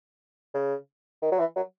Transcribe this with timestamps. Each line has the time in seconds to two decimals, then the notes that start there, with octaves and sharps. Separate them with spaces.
0.54 C#3
1.22 D#3
1.32 F#3
1.39 E3
1.56 F#3